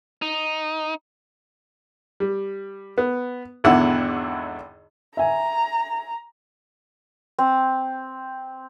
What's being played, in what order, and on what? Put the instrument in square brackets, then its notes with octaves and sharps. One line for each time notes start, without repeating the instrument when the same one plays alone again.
[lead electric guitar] D#4
[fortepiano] G3
B3
G#1 E2 D3 E4 F#5 E6
[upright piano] E5 G#5 [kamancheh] A#5
[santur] C4